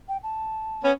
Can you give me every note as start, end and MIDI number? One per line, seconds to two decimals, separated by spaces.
0.08 0.17 79
0.23 0.82 81
0.83 0.92 59
0.83 0.92 61